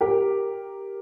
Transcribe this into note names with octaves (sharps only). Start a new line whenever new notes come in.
G4 A#4